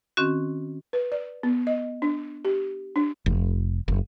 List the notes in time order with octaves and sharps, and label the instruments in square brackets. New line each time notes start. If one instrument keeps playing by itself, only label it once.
[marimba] D#3 C4 C#4 F#4
[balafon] B4
D5
B3
D#5
D4
G4
D4
[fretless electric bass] F1
F#1